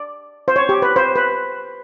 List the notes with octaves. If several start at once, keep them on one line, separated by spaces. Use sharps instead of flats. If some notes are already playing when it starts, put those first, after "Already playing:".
Already playing: D5
C5
C#5
G4
B4
C5
B4